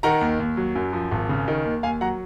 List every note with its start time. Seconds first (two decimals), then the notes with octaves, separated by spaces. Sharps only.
0.03 D#3 F#5 A#5
0.21 D#2
0.40 D#2
0.57 F#3
0.75 F#2
0.93 F3
1.11 G#1
1.29 C#3
1.48 D#3
1.65 D#2
1.83 D#2 F5 G#5
2.01 F#3 F#5 A#5